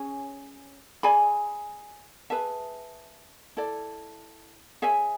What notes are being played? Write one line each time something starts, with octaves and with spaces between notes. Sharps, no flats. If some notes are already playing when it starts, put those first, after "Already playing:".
Already playing: C#4 G#4 C#5 G#5
G#4 D5 G#5 B5
G#4 B4 E5 A5
E4 A4 D5
G#4 C#5 E5 G#5